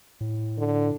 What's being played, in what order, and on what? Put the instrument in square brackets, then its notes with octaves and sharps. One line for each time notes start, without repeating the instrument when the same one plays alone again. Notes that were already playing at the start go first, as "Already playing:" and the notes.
[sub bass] A2
[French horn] D3